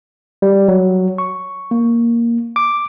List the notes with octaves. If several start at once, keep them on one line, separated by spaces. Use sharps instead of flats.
G3
F#3
C#6
A#3
D6